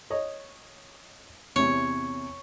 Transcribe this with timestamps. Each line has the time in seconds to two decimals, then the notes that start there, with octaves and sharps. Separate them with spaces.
0.10 C#5 D#5
1.56 E2 C3 C#5